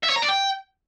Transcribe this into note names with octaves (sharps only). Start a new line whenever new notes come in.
E5
C#5
A#5
D5
G5